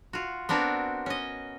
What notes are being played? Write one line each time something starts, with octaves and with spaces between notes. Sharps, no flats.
F4 F#4
B3 C4 D4 F#4 A#4
C#4 D#5